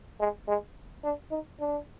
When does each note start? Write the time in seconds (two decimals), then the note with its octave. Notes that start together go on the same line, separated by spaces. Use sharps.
0.20 G#3
0.48 G#3
1.04 D4
1.31 D#4
1.60 D4